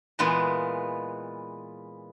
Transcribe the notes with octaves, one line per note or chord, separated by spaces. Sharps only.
A#2 E3 G#3 B3 F4